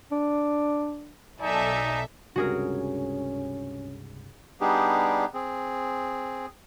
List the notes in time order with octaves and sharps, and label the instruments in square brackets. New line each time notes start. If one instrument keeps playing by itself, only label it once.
[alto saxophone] D4
[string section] B1 A4 E5 [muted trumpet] D#4 [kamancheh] D5 G#5
[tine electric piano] C#2 G2 C3 [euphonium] C#4 [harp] F#4 G#4 A#4
[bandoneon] G3 B3 D4 D#4 G4 G#4
C4 G#4